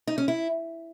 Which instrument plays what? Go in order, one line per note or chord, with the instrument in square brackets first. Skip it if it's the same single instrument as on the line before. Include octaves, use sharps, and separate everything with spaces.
[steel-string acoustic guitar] D#4
C#4
E4